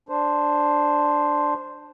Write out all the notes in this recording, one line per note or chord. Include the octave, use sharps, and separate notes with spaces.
D4 C5